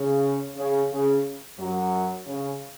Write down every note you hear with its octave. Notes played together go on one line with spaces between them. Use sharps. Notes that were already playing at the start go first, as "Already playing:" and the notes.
Already playing: C#3
C#3
C#3
F#2 F#3
C#3